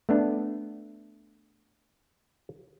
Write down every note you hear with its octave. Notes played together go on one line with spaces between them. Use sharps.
A3 B3 D4